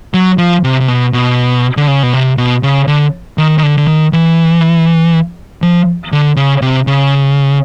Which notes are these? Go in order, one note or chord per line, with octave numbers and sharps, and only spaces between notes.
F#3
F3
C3
C3
B2
B2
D3
C#3
B2
C3
B2
C#3
D3
D#3
D#3
D3
D3
D#3
E3
F3
D3
C#3
C3
C#3